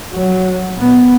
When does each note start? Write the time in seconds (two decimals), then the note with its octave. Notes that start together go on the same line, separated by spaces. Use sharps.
0.13 F#3
0.77 A#2 B3